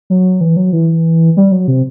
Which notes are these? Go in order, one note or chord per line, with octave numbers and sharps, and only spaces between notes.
F#3
E3
F#3
E3
G3
F#3
C3